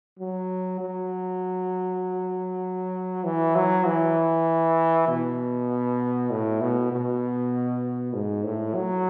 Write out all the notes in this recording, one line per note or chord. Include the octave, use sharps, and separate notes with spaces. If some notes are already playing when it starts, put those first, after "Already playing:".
F#3
F#3
E3
F#3
E3
B2
A2
B2
B2
G#2
A2
F#3